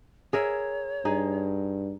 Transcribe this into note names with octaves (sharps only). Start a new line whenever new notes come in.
G#4 A#4 C#5 E5
G2 D#4 G#4